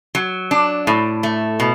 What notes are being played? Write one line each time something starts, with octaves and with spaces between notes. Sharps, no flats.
F#3
D4
A2
A3
B2